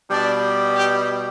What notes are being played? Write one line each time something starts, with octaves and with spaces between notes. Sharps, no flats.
B2 G3 D4
G4